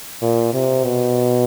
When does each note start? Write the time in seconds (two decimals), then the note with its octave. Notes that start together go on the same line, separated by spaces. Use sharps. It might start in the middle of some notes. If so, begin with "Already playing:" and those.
0.22 A#2
0.53 C3
0.84 B2